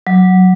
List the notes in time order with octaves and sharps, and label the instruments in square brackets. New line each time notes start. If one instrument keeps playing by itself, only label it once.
[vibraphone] F#3